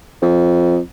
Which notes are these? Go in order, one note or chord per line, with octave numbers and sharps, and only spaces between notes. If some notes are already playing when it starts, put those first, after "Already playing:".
F2